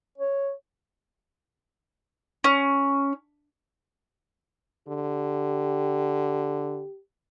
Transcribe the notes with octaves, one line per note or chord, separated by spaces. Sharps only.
C#5
C#4
D3 G4